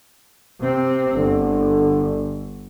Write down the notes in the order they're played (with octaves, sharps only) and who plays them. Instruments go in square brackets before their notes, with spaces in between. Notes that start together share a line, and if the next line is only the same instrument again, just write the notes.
[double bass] C3 C4
[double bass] G1 [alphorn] D3